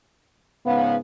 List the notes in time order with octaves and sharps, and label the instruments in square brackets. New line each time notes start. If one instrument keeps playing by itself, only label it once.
[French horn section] G#2 C#3 B3 [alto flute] F5